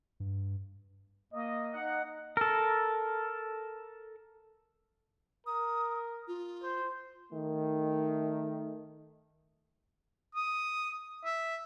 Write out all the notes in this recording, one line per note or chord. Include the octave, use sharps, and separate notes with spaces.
G2
A#3 D#5
D#4 F#5
A4 A#4
A#4 D#6
F4
C5
D#3 A3
D#6
E5